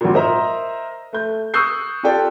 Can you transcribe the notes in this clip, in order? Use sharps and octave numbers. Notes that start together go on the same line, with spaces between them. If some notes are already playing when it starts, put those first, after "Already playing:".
G#1 A#2
A#4 C5 D#5 E5 A#5
A3 G6
C#6 D#6 E6 F#6 G6 C7
F4 G4 A4 D5 G5